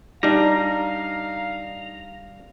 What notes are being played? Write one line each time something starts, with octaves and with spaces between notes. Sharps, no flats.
G3 D4 D#4 F5 A#5